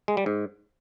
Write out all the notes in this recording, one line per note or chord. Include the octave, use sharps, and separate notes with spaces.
G#3
G3
G#2